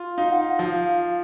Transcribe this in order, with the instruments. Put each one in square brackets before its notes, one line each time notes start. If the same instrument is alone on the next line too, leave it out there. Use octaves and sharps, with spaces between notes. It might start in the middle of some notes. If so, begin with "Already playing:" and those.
Already playing: [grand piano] F4
[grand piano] D#4 [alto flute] F5
[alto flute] F#5
F5
[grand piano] F3